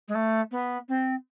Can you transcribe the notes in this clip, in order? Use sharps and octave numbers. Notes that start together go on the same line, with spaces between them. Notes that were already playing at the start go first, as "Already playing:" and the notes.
G#3
A3
B3
C4